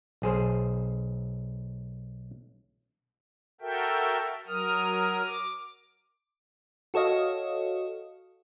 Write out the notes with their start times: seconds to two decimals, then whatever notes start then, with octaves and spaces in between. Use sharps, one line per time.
0.22 B1 G#4 C5
3.61 F#4 A4 A#4 E5 G5
4.48 F#3 A#4 D#6 F6
5.26 D6
6.94 F#4 A4 C#5 D#5 F5